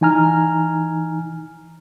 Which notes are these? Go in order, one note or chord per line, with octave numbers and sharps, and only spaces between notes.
E3 D#4 G#5 A#5 F6